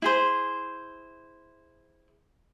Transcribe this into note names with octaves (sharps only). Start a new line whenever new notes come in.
E4 G#4 C5